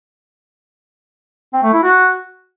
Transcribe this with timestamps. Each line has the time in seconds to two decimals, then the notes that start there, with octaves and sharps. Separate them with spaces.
1.54 C4
1.63 A3
1.73 E4
1.83 F#4